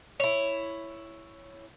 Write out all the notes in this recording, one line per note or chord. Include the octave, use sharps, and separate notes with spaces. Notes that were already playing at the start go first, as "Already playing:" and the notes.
E4 C#5